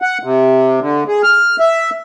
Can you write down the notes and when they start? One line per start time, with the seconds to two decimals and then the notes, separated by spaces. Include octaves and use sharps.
0.02 F#5
0.23 C3
0.80 D3
1.08 G#4
1.23 F6
1.60 E5